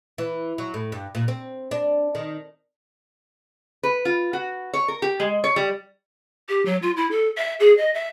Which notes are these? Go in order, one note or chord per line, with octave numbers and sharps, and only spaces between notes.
E3
F#3
A2
G2
A#2
C4
D4
D#3
B4
F4
F#4
C#5
A#4
G4
G#3
C#5
G3
G4
F#3
F4
E4
A4
E5
G#4
D#5
E5